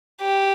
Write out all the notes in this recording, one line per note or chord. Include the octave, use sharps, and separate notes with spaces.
G4